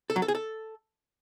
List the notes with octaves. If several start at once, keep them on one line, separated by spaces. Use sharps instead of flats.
A4
F#3
A4
G#4
A4